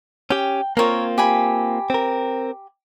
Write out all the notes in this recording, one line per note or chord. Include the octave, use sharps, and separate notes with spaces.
C#4 G4 G5
A#3 C4 F4 A#4 C#5
G4 G#5 B5
C4 A#4